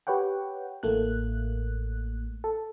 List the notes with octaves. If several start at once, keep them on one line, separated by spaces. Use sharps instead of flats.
G4 B4 C#5 F#5 G5
A1 A2 A3 A#3 F#6
A4